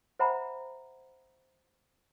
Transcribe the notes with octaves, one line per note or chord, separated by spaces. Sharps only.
C5 E5 F#5 G5 A#5 B5